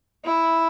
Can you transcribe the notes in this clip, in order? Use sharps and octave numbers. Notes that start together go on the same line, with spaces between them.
E4